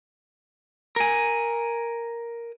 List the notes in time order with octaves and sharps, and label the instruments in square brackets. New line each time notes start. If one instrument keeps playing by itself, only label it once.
[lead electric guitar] A#4 G#5